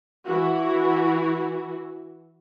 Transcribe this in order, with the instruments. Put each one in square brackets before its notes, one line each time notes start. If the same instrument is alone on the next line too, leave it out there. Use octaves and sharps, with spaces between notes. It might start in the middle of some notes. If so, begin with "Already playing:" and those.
[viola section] E3 F#4